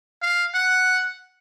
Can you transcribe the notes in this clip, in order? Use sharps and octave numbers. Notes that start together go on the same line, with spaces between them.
F5
F#5